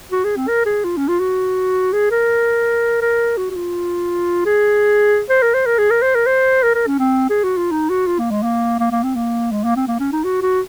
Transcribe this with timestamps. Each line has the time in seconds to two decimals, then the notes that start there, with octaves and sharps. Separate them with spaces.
0.12 F#4
0.24 G#4
0.36 C4
0.48 A#4
0.66 G#4
0.84 F4
0.97 C#4
1.08 F4
1.20 F#4
1.93 G#4
2.11 A#4
3.01 A#4
3.37 F#4
3.50 F#4
3.55 F4
4.45 G#4
5.29 C5
5.42 A#4
5.54 C5
5.66 A#4
5.78 G#4
5.90 A#4
6.02 C5
6.15 A#4
6.26 C5
6.63 A#4
6.75 A#4
6.87 C#4
6.99 C4
7.29 G#4
7.43 F#4
7.57 F4
7.71 D#4
7.89 F#4
8.07 F4
8.19 A#3
8.31 G#3
8.43 A#3
8.79 A#3
8.91 A#3
9.03 C4
9.15 A#3
9.52 G#3
9.64 A#3
9.76 C4
9.88 A#3
10.00 C#4
10.12 D#4
10.24 F#4
10.42 F#4